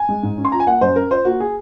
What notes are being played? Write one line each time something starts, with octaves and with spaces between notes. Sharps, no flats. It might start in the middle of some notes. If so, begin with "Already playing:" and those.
Already playing: G#5
G#3
G#2
C#4
C6
F3 A#5
G#5
A#3 F#5
F#2 C5
C#4 A#4
F3 C5
A#3 F#4
G#4